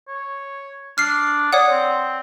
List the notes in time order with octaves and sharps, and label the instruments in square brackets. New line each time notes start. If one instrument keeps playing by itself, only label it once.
[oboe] C#5
[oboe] D4 [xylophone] F6 C7
[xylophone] C#5 D5 F#5 [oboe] D#6
[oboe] C4